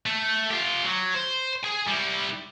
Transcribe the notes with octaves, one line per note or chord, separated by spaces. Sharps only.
A3
F4 G4
F#3
C5
G#4 G#5
G3 E4